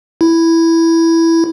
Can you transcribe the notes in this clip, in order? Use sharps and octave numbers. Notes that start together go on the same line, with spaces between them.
E4